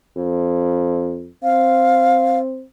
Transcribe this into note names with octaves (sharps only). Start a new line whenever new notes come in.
F2
C4 F5